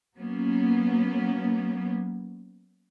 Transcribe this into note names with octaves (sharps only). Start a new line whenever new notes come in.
F#3 A#3 B3 C#4